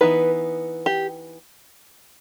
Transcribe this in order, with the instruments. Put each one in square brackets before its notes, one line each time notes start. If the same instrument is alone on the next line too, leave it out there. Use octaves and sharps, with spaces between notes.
[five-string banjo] E3 B3 D#4 B4
G4